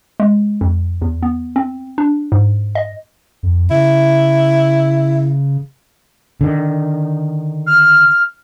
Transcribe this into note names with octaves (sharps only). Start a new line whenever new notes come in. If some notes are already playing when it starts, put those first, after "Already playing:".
G#3
F2
E2
B3
C4
D4
G#2
D#5
F2
C#3 E4
D3 D#3
F6